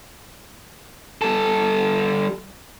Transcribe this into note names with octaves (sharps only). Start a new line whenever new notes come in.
G3 A4